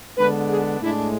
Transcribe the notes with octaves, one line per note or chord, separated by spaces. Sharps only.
D3 G#3 B3 D4 B4
G#4
A2 G#3 D4 E4